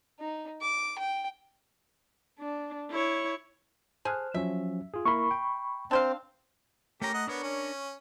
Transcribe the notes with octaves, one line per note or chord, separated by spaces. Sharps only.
D#4
D6
G5
D4
E4 C#5
G#4 A4 C5 F6 F#6
F3 F#3 C#4 E5
F4 G#4
A#3 E4 A#4 B5 C#6
G5
C4 D4 C5 F5
A3 C#4 G4 A#4 A#5
D#5 F#5
B3 D4 A#4 C#5
C#4